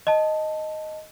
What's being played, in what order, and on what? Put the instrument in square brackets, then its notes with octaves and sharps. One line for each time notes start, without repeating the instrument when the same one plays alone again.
[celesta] D#5 A5